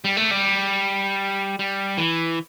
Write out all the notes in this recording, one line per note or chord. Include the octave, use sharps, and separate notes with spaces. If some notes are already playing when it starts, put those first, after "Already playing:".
G3
A3
G3
G3
E3